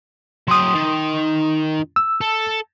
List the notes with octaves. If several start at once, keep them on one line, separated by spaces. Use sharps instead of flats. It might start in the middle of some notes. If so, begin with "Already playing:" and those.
F#3 G5 C6 D#6
D#3
E6
A4